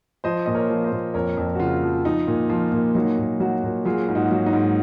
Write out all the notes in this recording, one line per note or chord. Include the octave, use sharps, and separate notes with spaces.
F3 C5 D#5
A#2 D#5
A#4 C#5
F3
C5 D#5
A#2
F2 A#4 C#5
F2
F#4
C#3 F4
F3
F3 D#4
A#2
F3 F4
A#2
F#3 D#4
A#2
F#3 D#4 F#4
A#2
F#3 F4 G#4
G#2
D#4 F#4
F#3
D#4
G#2